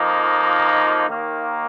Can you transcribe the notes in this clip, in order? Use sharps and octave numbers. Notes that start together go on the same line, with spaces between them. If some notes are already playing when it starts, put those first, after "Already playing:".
Already playing: F2 F3 A#3 D#4
D#2 D#3 A#3